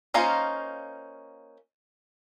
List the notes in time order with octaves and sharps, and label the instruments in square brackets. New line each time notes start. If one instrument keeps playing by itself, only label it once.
[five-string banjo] A#3 C#4 D#4 F4 C5